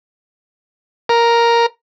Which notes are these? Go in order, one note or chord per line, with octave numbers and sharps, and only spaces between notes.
A#4